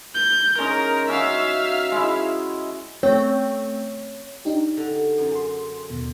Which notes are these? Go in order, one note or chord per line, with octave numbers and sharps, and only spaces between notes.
G6
G#3 C#4 D#4 A#4
C#4 F#4 E5 F5
G#3 E4
A3 C4 C#5 G5
D4 D#4 G4
D3
F#2
G#4 C6
D#2 B2